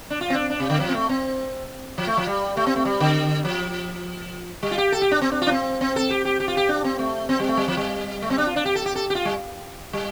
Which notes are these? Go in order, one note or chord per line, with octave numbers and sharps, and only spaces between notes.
D4
F4
C4
D4
D4
C3
D3
F3
C4
A3
C4
F3
A3
F3
G3
A3
C4
A3
G3
D3
F3
G3
F4
G4
A4
G4
D4
C4
D4
F4
D4
C4
C4
A4
G4
G4
G4
F4
G4
D4
C4
A3
C4
G3
A3
G3
F3
G3
A3
C4
D4
F4
D4
G4
A4
G4
A4
G4
F4
G3
G3